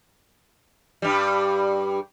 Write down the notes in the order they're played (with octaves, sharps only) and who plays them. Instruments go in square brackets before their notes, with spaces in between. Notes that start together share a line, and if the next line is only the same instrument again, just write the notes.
[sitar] G2 G3